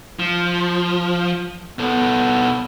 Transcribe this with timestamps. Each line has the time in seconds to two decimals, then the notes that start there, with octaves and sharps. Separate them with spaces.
0.19 F3
1.79 B2 B3 A4